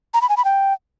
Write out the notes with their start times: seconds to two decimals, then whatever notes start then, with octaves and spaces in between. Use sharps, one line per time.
0.14 A#5
0.22 B5
0.29 G#5
0.37 B5
0.45 G5